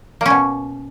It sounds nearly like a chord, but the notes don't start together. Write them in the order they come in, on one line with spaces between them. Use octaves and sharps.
A#3 C#4 B2